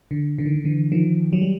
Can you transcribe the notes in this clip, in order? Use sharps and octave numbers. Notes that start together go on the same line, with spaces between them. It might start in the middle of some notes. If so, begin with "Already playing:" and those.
D3
D3
D#3
D3
D3 E3
D#3 F3
F#3
G3